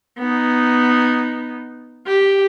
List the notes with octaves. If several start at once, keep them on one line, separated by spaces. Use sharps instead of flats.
B3 D#4
G4